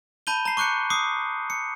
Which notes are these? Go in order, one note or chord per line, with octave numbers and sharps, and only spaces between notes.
A5 B5 G6 D#7 G7
A#5 C7
C#6 D6 F#6 G6 C#7
D6 D#6 C7
C#7